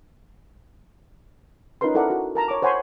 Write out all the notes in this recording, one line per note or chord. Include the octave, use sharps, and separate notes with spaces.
C#4 D#4 F4 A#4 B4 C6
E4 A4 A#4 D5 F#5
F#4
A#4 A5 A#5
C#5 D6
C5 C#5 F#5 G#5 B5 C6